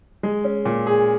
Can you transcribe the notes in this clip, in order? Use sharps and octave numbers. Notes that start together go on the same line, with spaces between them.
G#3
C#4
A#2
G#4